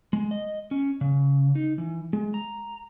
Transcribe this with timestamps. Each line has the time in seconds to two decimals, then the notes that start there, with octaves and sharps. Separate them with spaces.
0.13 G#3
0.31 D#5
0.71 C#4
1.01 C#3
1.55 D#4
1.78 E3
2.13 G#3
2.34 A#5